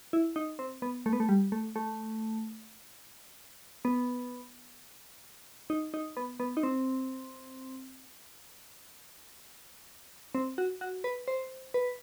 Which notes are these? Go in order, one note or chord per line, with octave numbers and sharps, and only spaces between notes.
E4
D#4
C4
B3
A3
B3
A3
G3
A3
A3
B3
D#4
D#4
B3
B3
D#4
C4
C4
F#4
F#4
B4
C5
B4